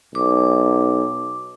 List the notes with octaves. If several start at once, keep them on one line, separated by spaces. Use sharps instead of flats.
B1 D6